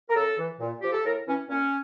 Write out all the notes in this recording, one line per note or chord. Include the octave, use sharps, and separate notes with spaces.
A#4
C#3 A4
E3
A#2
F3 G4
A4
A2 A#4
E3 C#4
A#2 C#4